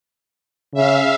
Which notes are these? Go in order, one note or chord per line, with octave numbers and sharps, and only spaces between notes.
C#3 E5 F5